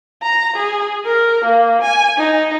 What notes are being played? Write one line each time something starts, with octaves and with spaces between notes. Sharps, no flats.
A#5
G#4
A#4
A#3
G#5
D#4